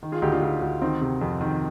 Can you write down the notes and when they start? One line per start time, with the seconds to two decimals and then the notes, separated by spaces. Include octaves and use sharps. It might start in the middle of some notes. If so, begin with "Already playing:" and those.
0.03 D#3
0.12 F4 G#4
0.22 D2 D#4 G4
0.32 D4 F4
0.42 D2
0.61 D2
0.81 D#3 C4 D#4
1.01 C3
1.21 F2
1.41 D#3